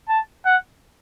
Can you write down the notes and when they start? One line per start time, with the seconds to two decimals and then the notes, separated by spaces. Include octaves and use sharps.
0.09 A5
0.46 F#5